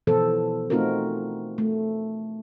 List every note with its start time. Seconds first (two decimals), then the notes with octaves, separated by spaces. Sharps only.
0.07 B2 E3 F3 B3 A4 C5
0.70 A3 C4 D#4 F4 F#4 A#4
1.58 A3